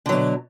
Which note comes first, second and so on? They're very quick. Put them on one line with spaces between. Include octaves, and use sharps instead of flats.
D3 F#3 B2